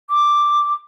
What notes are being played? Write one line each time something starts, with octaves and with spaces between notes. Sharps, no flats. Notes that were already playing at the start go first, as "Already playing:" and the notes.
D6